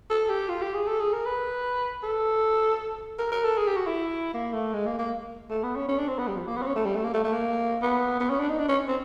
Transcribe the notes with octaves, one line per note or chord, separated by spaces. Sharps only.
A4
G4
F4
G4
G#4
A4
G#4
A#4
B4
A4
A#4
A#4
A4
G#4
G4
F#4
E4
A#3
A3
G#3
A#3
A#3
A3
B3
C#4
C#4
D4
C4
B3
G3
F3
A#3
B3
C4
C#4
A3
G3
A3
A#3
A3
A3
A#3
B3
B3
C#4
D4
D#4
D4
C#4
C4